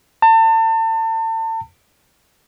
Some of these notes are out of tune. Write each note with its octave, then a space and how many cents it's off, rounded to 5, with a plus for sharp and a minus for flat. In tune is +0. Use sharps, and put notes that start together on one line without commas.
A5 +35